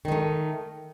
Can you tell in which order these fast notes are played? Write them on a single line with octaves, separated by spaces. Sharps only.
D#3 D#4 A3